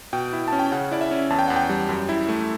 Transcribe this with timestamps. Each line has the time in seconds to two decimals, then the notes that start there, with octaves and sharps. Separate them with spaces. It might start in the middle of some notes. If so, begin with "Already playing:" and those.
0.13 B2 G5
0.33 E4
0.48 C#4 A5
0.59 G5
0.72 C#3 F#5
0.91 E4 D5
1.01 E5
1.11 C#4
1.30 E2 A5
1.39 G5
1.48 E2 F#5
1.56 G5
1.69 G3
1.89 F#2
2.09 E4
2.29 A3